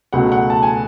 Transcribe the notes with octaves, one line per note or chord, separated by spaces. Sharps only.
C#2 B2 F#3 A3 F#5
F#5
A5
G#5